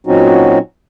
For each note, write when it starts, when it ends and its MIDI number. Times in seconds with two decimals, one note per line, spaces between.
0.07 0.58 46
0.07 0.58 54
0.07 0.58 60
0.07 0.58 61
0.07 0.58 63
0.07 0.58 66